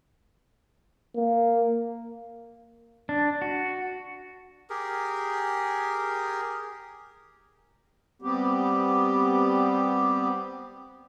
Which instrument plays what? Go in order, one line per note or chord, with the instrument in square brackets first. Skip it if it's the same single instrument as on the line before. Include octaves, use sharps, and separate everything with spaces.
[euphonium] A#3
[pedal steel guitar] D4
F#4
[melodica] G4 G#4 A#4
[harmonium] G3 B3 C4 G4